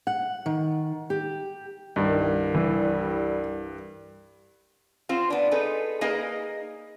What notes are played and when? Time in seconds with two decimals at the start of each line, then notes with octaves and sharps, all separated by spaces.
0.07 F#5
0.46 D#3
1.10 G4
1.96 C2 G2 D#3
2.54 E3 G3
5.09 C4 F4 C5
5.30 B3 D4
5.51 D#4 G#4 A4 B4
6.01 A#3 D#4 G#4 A#4 B4 D#5